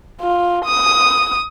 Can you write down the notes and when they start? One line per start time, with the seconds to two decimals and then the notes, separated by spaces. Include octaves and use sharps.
0.22 F4
0.65 D#6